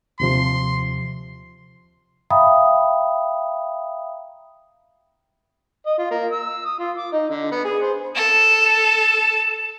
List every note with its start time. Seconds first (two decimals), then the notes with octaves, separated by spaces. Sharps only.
0.20 D#2 C3 F3 C6
2.30 E5 F5 G5 A#5 B5 D#6
5.86 D#5
5.98 F4
6.11 A#3
6.32 E6
6.65 D#6
6.79 F4
6.98 D6
7.13 D#4
7.30 D3
7.52 B3
7.65 G#4
7.82 C5
8.15 A4 E7